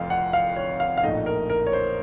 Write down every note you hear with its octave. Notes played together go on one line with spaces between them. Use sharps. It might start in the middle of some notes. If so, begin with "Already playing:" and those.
Already playing: F1 F2 F5
F#5
F5
C#5
F5
F5
A#1 A2 A3 D#4 D#5
A#4
A#4
C#5
C5